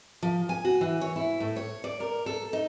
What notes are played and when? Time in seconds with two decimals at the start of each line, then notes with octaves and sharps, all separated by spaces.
0.23 F3
0.49 G#5
0.65 F#4
0.81 E3
1.01 C#5
1.16 E4
1.40 A2
1.56 C#5
1.84 D5
2.00 A#4
2.26 A4
2.53 D#4